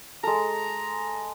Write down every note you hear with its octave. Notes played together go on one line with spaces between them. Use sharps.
G#3 A4 A#5